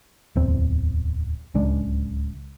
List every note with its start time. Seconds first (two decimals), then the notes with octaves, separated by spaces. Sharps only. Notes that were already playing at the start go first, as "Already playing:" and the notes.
0.36 D1 E2 C4
1.54 D1 C#2 G#3 D4